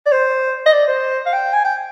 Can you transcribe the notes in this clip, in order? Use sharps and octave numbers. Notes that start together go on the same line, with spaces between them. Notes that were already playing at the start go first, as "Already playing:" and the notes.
D5
C5
D#5
D5
C5
F5
G5
G#5
G5